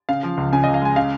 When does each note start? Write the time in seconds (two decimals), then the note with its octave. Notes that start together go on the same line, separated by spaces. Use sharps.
0.09 C#3 F5
0.23 F3
0.37 C#2
0.52 C#3 G#5
0.64 D#5
0.67 C#2
0.74 F5
0.82 G#3 G#5
0.96 C#3 F5